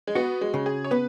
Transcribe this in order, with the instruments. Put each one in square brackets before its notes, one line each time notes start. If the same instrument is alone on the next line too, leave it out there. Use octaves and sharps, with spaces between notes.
[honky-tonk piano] G#3
[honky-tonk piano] B3 [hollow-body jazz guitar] F#4
[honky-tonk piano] G#3
[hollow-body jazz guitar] C#3
[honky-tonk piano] G#4
C#5
[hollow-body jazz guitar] B3 [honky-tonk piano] B4